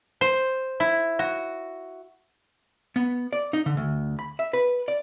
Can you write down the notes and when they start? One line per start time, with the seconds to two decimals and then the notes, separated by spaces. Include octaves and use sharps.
0.21 C5
0.80 E4
1.19 F#4
2.96 B3
3.33 D5
3.53 D#4
3.66 D3
3.77 D2
4.19 B5
4.39 E5
4.53 B4
4.88 D5